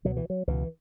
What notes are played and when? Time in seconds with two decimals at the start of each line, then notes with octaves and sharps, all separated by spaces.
0.05 C#2 B2 F#3
0.17 E3
0.30 F#3
0.47 C#2 B2 E3